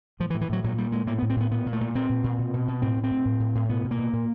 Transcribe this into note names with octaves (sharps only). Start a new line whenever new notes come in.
A2 F3
E3
A2
E3
A2 F#3
A#2 F#3
A#2 G3
A#2 G#3
A2 A#3
A2 B3
C4
A2 B3
A#2 B3
A#2
A3
A#2
A#2 C4
A#2
A#2
B2
B2
B2
A2 C4
A2
C4
A2
A2
A2
A2
B2 B3
B2
A#3
B2
A#2